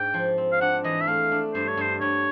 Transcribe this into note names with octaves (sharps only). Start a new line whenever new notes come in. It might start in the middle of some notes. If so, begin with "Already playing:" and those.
Already playing: G#2 D4 G5
F3
C4
F5
D4 F#5
E3 D#5
E5
A3 F5
D4
G2 C5
C#5
G2 C5
G2 C#5